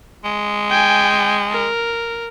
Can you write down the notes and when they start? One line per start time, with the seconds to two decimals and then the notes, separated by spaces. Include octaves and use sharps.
0.25 G#3
0.70 G5 G#5
1.51 A#4